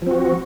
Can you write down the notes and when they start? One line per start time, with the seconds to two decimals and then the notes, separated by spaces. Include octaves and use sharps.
0.02 F3
0.06 C4
0.11 F#4